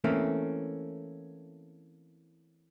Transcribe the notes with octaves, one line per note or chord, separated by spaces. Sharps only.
E3 A3 A#3 C4 C#4